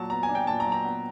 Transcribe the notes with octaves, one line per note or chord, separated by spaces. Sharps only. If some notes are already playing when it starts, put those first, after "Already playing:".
Already playing: A#2 F#3 A5
B3 A#5
G#5
D4
G5
A#2 A5
A#5
F#3
A#5
B3